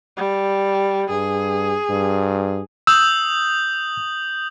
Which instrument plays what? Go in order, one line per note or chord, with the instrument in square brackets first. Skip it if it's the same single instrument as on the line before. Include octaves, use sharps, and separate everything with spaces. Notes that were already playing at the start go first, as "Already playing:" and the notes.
[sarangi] G3
[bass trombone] G2 [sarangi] G#4
[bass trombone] G2
[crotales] D#6 G6 F#7 [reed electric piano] E6